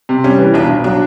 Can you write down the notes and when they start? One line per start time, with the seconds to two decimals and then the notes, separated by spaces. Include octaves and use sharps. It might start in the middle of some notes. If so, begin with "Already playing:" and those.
0.09 C3
0.24 G3 C#4
0.39 E3
0.54 B1 D4
0.69 B1
0.84 F#3 D4